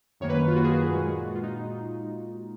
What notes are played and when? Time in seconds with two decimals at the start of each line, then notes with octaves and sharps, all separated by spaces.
0.20 F#2 D#3 A#3 C#5
0.30 B4
0.48 F4
0.56 F#4
0.64 G#4
0.73 F#4
0.92 A#2 G#3
1.27 F#4
1.35 F4
1.43 D#4